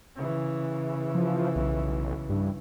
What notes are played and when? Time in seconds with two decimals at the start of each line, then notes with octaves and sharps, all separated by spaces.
0.16 C#3 E3
1.15 F3
1.56 B1
2.29 G2